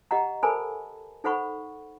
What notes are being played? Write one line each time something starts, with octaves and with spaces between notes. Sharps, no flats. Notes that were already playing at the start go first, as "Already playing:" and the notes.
G4 D#5 F#5 A#5
A4 A#4 C5 G#5 A5 B5
D#4 A4 C5 F#5 B5 C#6